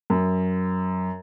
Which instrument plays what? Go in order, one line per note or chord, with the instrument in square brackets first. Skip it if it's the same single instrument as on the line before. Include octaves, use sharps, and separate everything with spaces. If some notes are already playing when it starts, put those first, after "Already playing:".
[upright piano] F#2